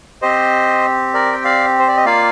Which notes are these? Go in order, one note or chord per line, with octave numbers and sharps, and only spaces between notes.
C4 G4 C5 D#5
A#4 D5
G5
D5 F5
C5
D5
D#5
A#3 F4 D5 F5